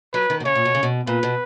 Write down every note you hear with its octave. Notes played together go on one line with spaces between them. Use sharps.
F#3 B4
D#3
B2
C#3 C#5
A#2
B2
C#3
B2
A#2 B4
B2